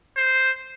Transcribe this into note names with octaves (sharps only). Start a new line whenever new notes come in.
C5